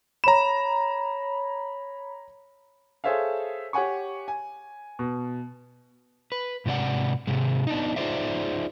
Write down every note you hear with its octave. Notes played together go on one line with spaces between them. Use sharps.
C#5 A#5 B5 E7
G#4 A4 C5 C#5 E5 F5
G4 C#5 F#5 G#5 C#6
G#5
B2
B4
G#2 C3 D#4 D5 F#5
G#2 C3 G#3
B3 D4 D#4
D#4 F4 G#4 C5 D5 E5